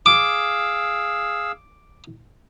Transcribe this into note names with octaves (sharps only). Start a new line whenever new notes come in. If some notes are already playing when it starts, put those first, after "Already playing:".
G#4 F5 D6 E6